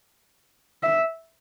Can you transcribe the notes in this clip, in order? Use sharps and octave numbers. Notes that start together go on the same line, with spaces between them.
E5